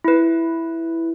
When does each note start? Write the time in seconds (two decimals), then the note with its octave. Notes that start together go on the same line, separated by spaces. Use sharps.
0.04 E4 B4